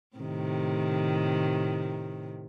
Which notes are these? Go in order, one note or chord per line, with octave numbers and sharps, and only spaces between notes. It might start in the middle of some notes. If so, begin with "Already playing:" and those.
A2 C3 D#3